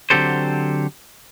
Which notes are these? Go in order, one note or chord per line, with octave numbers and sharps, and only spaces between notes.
D3 F#3 C4 G4 A4 C5